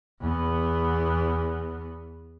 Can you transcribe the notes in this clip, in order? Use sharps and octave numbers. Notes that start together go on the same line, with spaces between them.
E2 B3